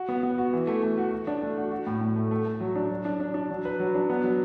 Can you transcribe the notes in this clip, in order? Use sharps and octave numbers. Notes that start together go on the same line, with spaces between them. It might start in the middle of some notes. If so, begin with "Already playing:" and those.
Already playing: F#4
B3
B3
F#4
E3
A3
A3
F#4
F#4
D4
A3
F#4
F#4
A2
A2
A3
A3
A3
F#3
D4
F#3
D4
D4
D4
F#3
B4
F#3
D4
B3
F#3